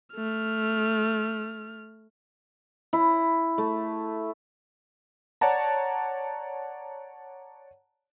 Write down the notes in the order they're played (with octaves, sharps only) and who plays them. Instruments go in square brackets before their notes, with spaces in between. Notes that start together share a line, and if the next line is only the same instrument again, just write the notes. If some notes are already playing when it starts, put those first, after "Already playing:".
[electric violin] A3 F6
[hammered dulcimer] E4
A3
[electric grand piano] C#5 D5 F#5 A5 A#5